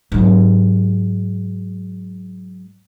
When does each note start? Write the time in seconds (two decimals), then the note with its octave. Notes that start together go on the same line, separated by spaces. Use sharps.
0.12 G#2 F#3